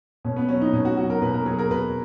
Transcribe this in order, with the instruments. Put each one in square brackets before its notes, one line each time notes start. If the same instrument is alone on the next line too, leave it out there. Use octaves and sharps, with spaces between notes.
[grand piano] B2 C#4
B3
F#3 C#4
D#4
B2 C#4
F#4
F#3 F#4
A#4
B2 B4
A#4
F#3 G#4
A#4
B2 B4